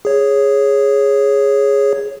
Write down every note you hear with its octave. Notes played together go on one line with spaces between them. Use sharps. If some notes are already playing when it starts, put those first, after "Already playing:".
G#4 C#5